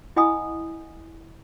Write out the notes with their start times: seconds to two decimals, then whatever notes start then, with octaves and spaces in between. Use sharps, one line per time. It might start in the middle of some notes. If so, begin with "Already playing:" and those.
0.16 E4 D#5 F#5 G#5 B5 D#6